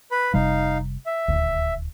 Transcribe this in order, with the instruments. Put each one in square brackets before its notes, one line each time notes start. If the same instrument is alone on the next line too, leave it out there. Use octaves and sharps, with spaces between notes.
[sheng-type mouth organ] B4 B5
[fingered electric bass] F1 C3 G3 [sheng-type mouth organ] D#4 F5
[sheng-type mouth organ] E5
[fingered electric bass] D#1 G#1 D2